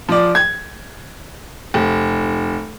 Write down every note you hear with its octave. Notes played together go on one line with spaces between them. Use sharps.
F3 D5
G#6
F1